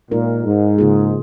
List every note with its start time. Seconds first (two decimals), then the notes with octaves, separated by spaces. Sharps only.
0.11 A#2 G#3 D#4 A#4
0.45 G#2
0.78 C#3 A#3 F4 G#4